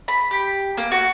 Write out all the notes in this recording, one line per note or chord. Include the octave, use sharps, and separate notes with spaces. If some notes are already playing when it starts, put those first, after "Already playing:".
B5
G4
A#3
F#4